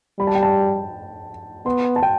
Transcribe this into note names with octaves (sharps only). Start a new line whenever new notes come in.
G3 B5
A5
G5
A5
B3 C6
A5
G5